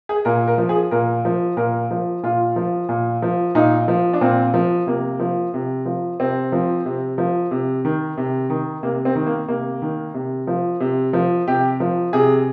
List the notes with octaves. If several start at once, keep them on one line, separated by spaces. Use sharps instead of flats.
G#4
A#2 A#4
A#4
F3
G#4
A#2 A#4
F3
A#2 A#4
F3
A#2 F4
F3
A#2
F3
A#2 D#4
F3
D4
A#2 C4
F3
C3 A#3
F3
C3
F3
C3 C4
F3
C3
F3
C3
D#3
C3
D#3
C3 A#3
C4
D#3
A#3
C3 A#3
D#3
C3
F3
C3
F3
C3 G4
F3
C3 G#4